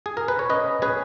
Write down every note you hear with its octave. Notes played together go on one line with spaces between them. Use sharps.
G#4
A#4
B4
C#5
C#4 B4 D#5
C#4 G#4 B4